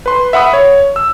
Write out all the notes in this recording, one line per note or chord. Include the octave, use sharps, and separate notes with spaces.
B4 C6
E5 F#5 B5 D#6
C#5
E6